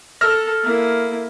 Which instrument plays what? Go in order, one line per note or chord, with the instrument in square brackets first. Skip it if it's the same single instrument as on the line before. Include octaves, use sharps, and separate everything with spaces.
[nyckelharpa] A4 [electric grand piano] E6 F6 A#6
[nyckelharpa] A#3 E4